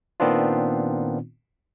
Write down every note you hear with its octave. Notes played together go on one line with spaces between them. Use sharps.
A#2 D#3 B3 C4 D4 F4